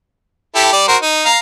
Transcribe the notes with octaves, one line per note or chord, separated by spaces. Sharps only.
E4 G4 A4
G3 D5
F#4 A#4 C5
D#4
F5 A#5